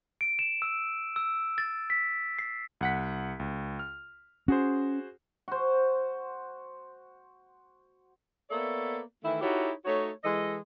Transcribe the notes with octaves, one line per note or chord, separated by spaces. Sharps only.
D7
E7
E6
E6
A6
B6
C7
C2 F#5 B6
C#2
F6
C#4 F#4 G#4 C5
F#4 C5
A#3 B3 A4 C#5 D5 E5
D#3 E3 A3 E4
D#4 E4 F#4 G4 A4 C#5
A3 D#4 F#4 C#5
E3 G#3 A4 D#5